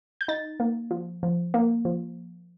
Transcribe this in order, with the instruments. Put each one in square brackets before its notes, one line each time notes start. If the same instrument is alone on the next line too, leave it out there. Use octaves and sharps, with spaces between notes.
[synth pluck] G6
D#4 A6
A#3
F3
F3
A#3
F3